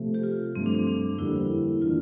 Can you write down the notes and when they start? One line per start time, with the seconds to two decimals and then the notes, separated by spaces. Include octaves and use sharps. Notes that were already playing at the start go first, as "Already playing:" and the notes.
Already playing: C3 F3 A3
0.14 G4
0.23 F4
0.55 G2 F3 A3 C4
0.66 D4
0.75 C4
0.87 D4
1.18 F2 D3 G3 A#3 E4
1.82 E3 A#3 D4 F4